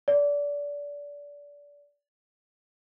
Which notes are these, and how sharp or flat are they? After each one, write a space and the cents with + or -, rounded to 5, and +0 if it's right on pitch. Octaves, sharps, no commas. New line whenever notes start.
D5 -25